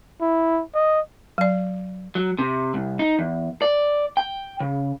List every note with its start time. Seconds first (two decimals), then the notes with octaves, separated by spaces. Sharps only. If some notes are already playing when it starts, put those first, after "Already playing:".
0.21 E4
0.75 D#5
1.38 F#3 D5
2.15 F#3
2.39 C3
2.74 C2
2.99 D#4
3.19 E2
3.62 D5
4.17 G5
4.60 C#3